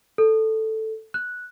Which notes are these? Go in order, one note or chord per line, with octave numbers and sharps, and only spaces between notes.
A4
F#6